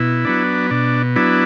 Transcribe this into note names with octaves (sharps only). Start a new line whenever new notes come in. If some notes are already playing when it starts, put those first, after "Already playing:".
Already playing: B2 E4
F#3 B3 D4
B2 D4
F#3 B3 D4 E4